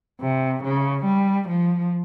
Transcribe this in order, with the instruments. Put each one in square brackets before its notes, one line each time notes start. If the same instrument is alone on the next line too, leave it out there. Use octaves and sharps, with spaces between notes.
[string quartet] C3
C#3
G3
F3